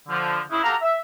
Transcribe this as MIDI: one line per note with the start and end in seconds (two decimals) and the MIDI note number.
0.09 0.39 50
0.09 0.39 53
0.50 0.59 49
0.50 0.59 64
0.63 0.74 66
0.63 0.74 67
0.63 0.74 69
0.63 0.74 77
0.63 0.74 82
0.81 0.99 76